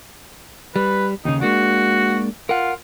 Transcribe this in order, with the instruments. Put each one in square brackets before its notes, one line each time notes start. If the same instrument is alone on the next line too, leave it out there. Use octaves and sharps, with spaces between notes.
[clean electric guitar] G3 [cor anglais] B4
[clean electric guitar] D#2 C#3 [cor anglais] D#4
[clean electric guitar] G#3 A#3 D4 [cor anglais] F#4
[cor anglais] F4 [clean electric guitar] A#4 F#5